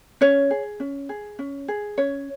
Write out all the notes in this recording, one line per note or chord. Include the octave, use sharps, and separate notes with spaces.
C#4 C#5
G#4
C#4
G#4
C#4
G#4
C#4 C#5